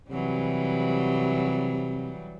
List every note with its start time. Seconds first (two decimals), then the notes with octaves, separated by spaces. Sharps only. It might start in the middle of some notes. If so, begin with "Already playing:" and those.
0.10 C3 E3 F#3 G3